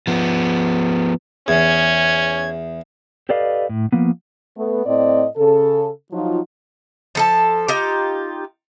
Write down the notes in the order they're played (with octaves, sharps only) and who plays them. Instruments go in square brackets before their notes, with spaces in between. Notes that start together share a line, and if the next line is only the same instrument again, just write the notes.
[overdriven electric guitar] F3 B3
[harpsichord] E2 [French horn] C#4 [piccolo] G#6
[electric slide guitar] G4 A4 B4 D5 D#5 F5
A2
F3 A#3 B3
[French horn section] A3 B3
A2 C4 D5 D#5
C#3 A4
F3 F#3 D#4 F4
[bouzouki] F3 A4 A5
D#4 F4 G4